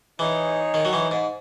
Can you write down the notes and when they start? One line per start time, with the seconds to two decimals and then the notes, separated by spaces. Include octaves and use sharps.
0.19 E3 D#4 G#4 C#5
0.74 D#3
0.85 F#3
0.93 E3
1.11 G#2